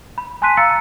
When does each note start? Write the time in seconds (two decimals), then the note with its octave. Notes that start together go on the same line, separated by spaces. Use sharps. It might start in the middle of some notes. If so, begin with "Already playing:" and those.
0.18 B5
0.42 G#5 A5 C6 F#6 B6 D#7
0.57 F5 A#5 E6 A6 C#7